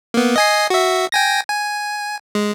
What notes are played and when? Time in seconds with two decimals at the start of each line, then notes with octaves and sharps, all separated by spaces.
0.14 A#3 B3
0.36 D#5 G#5 C7
0.70 F#4 E5
1.12 G5 G#5 A#6
1.50 G#5
2.35 G#3